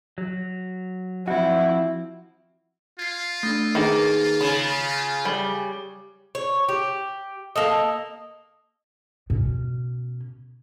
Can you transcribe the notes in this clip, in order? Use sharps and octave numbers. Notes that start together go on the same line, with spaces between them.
F#3
F3 C4 E4 F#4
F4 G#6 C7
A3 D4
D#3 A#3 D#4 G#4 B4
C#3 B5
G3
C#5
G4
A#3 A4 D#5
B2 C#4